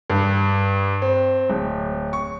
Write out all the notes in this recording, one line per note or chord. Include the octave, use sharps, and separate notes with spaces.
G2
C4
D1
C#6